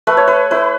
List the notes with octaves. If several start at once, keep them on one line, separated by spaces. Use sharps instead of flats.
A3 B4
C#5
B4
E4 B4